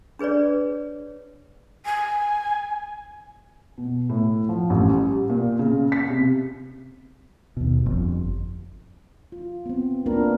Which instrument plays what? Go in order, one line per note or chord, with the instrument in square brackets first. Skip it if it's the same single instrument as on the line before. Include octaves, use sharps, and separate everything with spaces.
[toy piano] D4 G#4 B4 C#5 D5
[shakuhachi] G#5
[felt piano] B2
A2
F3
A1
G3
A#2
C#3
B6
C3
[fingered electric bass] D#2 B2
G1 F2
[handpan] F4
B3 C4
A#3 B3 D4 F4 A#4 B4